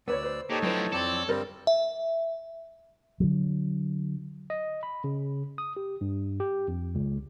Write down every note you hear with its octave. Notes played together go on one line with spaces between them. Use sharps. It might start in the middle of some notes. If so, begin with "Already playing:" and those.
D2 B3 B4 C#5 D5 E6
B4 C5
A#2 D#4 G4 A4 C#5
D2 F3 F#3 E4 B4 G5
F2 F3 C4 E4 A4 C#5 D5 A5
G2 D3 G3 C4 A#4 D5
E5
D3 F#3
D#5
B5
C#3
D#6
G4
G2
G4
F2
C#2